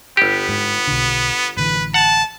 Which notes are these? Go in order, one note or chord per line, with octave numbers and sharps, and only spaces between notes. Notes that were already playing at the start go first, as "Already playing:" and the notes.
G1 B3 G4
G#2
B1 D3
A1 D3 E3 B4
F#5 A5